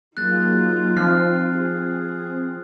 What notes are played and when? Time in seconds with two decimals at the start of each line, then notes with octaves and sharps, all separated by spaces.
0.17 F#3 A#3 D#4 F4 G#4 F#6 A6
0.97 F3 C4 F6 C7
1.58 G#4